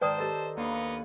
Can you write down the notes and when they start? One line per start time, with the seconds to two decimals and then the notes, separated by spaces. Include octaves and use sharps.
0.01 G#2 D#3 B4 C5 D5 G5 A5 D#6
0.18 G4 A4 D#5
0.57 D#2 B3 D4 D#4 F5